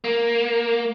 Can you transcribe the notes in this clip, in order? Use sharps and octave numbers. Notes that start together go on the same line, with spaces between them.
A#3